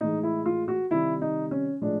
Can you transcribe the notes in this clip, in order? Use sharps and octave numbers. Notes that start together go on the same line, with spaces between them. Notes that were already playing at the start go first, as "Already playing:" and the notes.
A2 E3 G#3 D#4
E4
F4
F#4
C3 D#3 G3 E4
D#4
C#4
A2 F3 G#3 D4